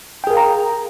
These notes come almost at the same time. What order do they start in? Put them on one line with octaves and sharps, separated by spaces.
G5 G#4 A#4 F5 A#5